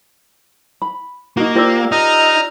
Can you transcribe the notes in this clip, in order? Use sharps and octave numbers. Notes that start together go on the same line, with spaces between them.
B5
A#3 D#4 F#4
F4 G4 A#4 C5 D5 E6
D#4 A#5 D#6 F6